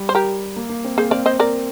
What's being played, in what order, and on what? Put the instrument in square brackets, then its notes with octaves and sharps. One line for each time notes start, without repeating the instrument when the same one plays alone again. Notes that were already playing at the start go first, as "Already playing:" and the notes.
Already playing: [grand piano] G3
[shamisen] C5
G4 A#4
[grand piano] A#3
A#3
C4
[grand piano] A#3 [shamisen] G#4 C5
[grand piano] C4 [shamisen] D5 F5
[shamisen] C5 D#5
A#4 D5